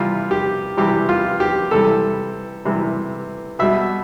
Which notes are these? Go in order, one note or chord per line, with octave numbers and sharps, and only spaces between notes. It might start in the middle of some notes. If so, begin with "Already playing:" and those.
Already playing: C3 E3 G3 F4
G4
C3 E3 G3 G4
F4
G4
C3 E3 G3 A4
C3 E3 G3
B2 G3 E5